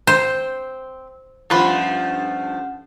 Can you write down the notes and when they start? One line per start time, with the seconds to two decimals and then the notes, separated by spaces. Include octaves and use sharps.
0.07 C4 C5
1.50 G2 F3 A3 C#4 F4 B4 F#5 C6